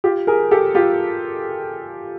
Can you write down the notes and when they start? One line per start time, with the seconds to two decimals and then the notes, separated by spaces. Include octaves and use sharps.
0.04 F4 G4
0.27 G#4 A#4
0.51 G4 A4
0.75 F4 G4